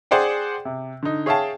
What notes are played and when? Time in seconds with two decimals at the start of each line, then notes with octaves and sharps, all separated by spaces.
0.11 G#4 C5 D5 F#5 G5
0.65 C3
1.03 D3 D#4
1.26 G#4 C#5 E5 F5 G5 A5